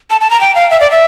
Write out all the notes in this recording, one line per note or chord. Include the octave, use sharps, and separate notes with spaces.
A5
A5
A#5
G5
F5
E5
D5
E5